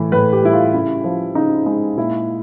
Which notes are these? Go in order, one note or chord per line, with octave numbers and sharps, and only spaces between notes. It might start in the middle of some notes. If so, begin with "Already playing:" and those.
Already playing: A2 E3
A2 B4
G4
G3 E4
F4
C#3 E4
F3
C#3 D#4
G#3 D#4
A#2 E4